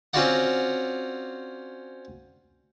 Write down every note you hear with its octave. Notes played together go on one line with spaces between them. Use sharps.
C4 C#4 F4 F#4 D5 F#5